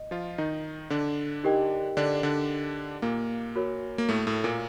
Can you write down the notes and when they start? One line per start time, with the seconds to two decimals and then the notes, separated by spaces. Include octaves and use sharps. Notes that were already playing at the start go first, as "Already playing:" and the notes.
Already playing: D#5
0.11 F3 F4
0.38 D#3 D#4
0.90 D3 D4
1.44 D#4 G4 A#4 D#5 G5
1.97 D3 D4
2.23 D3 D4
3.02 A#2 A#3
3.56 F#4 A#4 C#5
3.98 A#3
4.09 A2 A3
4.27 A2 A3
4.44 A#2 A#3